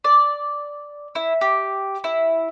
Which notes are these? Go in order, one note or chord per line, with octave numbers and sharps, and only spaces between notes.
D5
E4
G4
E4